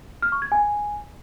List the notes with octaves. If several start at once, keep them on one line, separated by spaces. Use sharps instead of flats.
F6
C#6
G#6
G#5